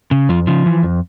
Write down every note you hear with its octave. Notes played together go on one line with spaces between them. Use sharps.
C#3
F2 F3
C#3 F3
E3
F2